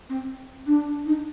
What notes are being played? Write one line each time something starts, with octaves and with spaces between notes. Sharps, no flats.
C4
D4
D#4